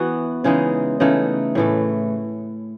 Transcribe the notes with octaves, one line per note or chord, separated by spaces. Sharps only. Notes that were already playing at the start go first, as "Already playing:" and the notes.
Already playing: E3 B3 F#4
C#3 E3 G#3 D#4
C#3 E3 A3 D#4
A2 E3 A3